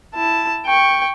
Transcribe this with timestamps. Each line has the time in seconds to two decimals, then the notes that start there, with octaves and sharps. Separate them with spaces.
0.15 E4 A5
0.66 G5 C#6